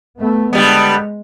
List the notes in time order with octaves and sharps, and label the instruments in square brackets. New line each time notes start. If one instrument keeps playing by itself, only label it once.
[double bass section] A3 B3
[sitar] D3 G3 B3 [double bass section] G#3